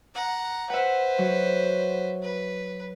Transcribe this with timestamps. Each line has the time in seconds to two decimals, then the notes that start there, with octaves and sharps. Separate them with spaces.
0.14 F#5 A#5
0.70 B4 C5 E5 F#5
1.18 F#3
2.22 B4